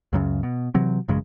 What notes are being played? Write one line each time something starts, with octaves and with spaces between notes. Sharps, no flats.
C#2 F#2 C#3
B2
C3 E3 F#3 C4
A1 F#2 C#3 G#3